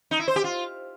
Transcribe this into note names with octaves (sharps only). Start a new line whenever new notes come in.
D#4
E4
C5
G4
F4